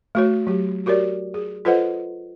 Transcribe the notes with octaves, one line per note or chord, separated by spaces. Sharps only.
A3 F#4 C#5
F#3 G4
F#4 G4 A#4 C#5 D5
G#4
F4 A4 B4 C5 D#5 F#5